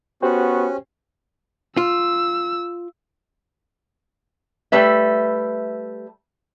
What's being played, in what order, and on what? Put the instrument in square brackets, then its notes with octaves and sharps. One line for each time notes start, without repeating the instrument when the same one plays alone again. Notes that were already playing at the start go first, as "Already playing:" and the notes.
[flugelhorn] B3 [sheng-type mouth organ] C#4 [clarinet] F#4 [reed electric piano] G4 C5 G5
[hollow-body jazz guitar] F4 [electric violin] E6
[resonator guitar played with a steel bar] G3 A3 B4 E5